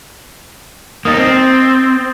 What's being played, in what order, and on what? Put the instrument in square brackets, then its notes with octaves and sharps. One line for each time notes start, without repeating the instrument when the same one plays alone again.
[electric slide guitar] A#3 D#4 [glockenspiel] D#6 A6
[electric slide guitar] C4